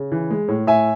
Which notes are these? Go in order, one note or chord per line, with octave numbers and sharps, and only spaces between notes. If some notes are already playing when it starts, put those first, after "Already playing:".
Already playing: C#3
E3
G#3
A2
A2 E5 G#5